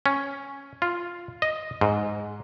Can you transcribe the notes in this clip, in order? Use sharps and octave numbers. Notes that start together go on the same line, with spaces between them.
C#4
F4
D#5
G#2